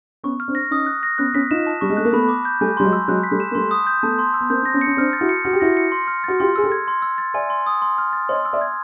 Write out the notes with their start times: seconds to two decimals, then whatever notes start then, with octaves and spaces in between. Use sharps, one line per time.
0.24 B3 C#4 C#6
0.40 F6
0.48 C4 D4
0.55 A#6
0.71 C#4 D#4 D#6
0.86 F#6
1.03 A#6
1.18 B3 C#4 F#6
1.34 B3 C#4 B6
1.51 D#4 F4 E7
1.67 A5
1.81 G3 C#6
1.90 G#3
1.97 A3 F#6
2.05 A#3
2.13 A3 B3 B5
2.29 D6
2.45 G6
2.61 G3 A3 G#5
2.77 G3 C6
2.84 F#3 G#3
2.93 E6
3.08 F#3 G#3 F#6
3.23 B6
3.31 G3 A3
3.40 E7
3.51 A#3
3.55 G3 A3 C6
3.71 D#6
3.87 G6
4.03 A3 B3 A5
4.19 C6
4.34 E6
4.41 B3
4.50 A#3 C4 G6
4.63 C4 A#6
4.74 B3 C#4
4.81 C#7
4.87 C#4
4.97 C4 D4 F6
5.13 A6
5.21 E4 F#4
5.29 C#7
5.45 F#4 F6
5.53 G4
5.60 E4 F#4 A#6
5.77 C#7
5.92 C6
6.08 F6
6.24 F#4 A6
6.40 F4 G4 C6
6.56 G#4 E6
6.64 G4 A4
6.72 G#6
6.88 C6
7.02 E6
7.18 A6
7.34 D5 E5 G#5
7.50 C6
7.66 D#6
7.82 C6
7.98 F6
8.13 A6
8.29 C#5 D#5 C6
8.45 E6
8.53 D5 E5
8.61 G#6